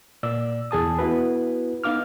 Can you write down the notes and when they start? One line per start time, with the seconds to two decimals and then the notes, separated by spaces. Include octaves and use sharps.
0.23 A#2 D5 E6
0.71 E2 G#4 A5 D#6
0.99 B3 E4 F#4 B4
1.84 B3 D#4 F5 D6 F6